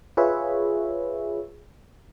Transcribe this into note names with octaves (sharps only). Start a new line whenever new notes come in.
F4 G#4 B4 C#5 E5